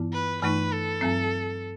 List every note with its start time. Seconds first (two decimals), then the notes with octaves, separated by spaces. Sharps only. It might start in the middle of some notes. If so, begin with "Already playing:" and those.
Already playing: G2 E3 B3 E4
0.13 B4
0.42 G2 E3 A3 D#4 B4
0.71 A4
1.01 G2 F#3 C4